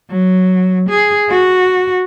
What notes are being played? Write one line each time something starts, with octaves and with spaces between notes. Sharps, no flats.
F#3
G#4
F#4